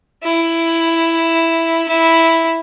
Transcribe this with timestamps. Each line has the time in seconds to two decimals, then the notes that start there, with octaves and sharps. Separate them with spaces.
0.24 E4
1.88 E4